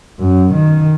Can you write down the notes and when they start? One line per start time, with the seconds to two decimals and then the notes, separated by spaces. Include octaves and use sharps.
0.19 F#2
0.54 D#3